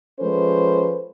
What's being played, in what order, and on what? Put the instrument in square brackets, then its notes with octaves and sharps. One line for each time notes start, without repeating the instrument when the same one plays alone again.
[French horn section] F3 G#3 C#4 A4 B4 C5